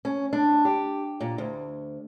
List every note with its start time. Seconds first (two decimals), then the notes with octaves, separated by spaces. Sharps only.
0.05 C#4
0.33 D4
0.65 G4
1.21 A#2
1.38 D2